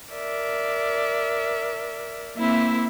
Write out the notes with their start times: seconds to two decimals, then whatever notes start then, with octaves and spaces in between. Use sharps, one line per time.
0.10 A#4 D5 E5
2.36 A#3 C4 E4 E5